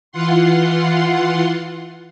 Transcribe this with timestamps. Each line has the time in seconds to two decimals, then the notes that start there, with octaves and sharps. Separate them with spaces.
0.12 E3 F4 F#5 C6